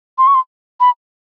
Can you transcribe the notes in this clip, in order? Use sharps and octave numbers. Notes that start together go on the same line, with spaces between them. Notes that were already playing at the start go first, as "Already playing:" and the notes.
C6
C#6
C6
B5